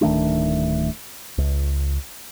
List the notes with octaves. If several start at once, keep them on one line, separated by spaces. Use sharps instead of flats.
D1 D#3 A3 D4
C#2